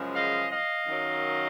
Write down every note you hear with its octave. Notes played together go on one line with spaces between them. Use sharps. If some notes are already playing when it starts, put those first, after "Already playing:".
Already playing: F#2 C#3 F3 G#3
D#5 F5
D#5 F5
F#2 D#3 F#3